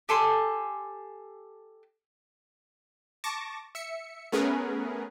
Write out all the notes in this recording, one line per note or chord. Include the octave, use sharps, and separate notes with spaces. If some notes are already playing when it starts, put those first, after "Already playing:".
G4 A4 G#5 C6
A5 C#6 D6 A#6
E5 C#7
A3 B3 C#4 G#4 A#4 B4